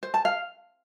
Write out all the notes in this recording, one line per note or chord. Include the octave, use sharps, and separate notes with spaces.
C5
A5
F5